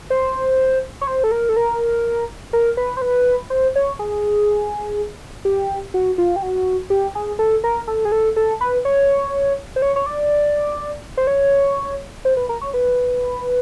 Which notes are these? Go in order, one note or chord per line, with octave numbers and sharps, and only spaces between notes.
C5
C#5
C5
A4
A#4
A4
A#4
A#4
B4
C5
B4
C5
C#5
G#4
G4
F#4
F4
G4
F#4
G4
G#4
A4
A#4
A4
G#4
A4
A4
B4
C#5
C5
C#5
C#5
D5
C5
C#5
C5
B4
A#4
C#5
B4